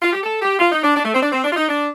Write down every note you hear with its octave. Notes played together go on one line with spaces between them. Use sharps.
F4
G4
A4
G4
F4
D#4
D4
D4
A3
C4
D4
C4
D4
F4
D#4
D4